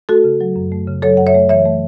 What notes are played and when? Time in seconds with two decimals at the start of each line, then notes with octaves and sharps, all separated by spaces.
0.09 A3 F#4 A4
0.24 C#3
0.41 F#3
0.56 F#2
0.72 A3
0.88 C#3
1.02 F#3 A4 C#5
1.17 F#2 F#5
1.27 C#5 E5
1.34 A3
1.49 E3 C#5 E5
1.65 A3